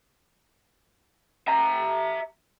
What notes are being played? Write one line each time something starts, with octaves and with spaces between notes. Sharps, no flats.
E5 A#5